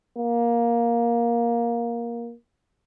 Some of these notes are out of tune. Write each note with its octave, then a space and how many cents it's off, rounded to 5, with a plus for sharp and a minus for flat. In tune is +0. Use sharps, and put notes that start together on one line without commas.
A#3 +10